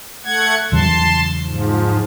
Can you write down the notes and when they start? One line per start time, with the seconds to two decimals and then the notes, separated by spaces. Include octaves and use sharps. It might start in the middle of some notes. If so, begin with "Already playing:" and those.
0.25 A3 F#5 G#6
0.72 E2 C#3 F#3 A5 C6
1.45 G#2 F3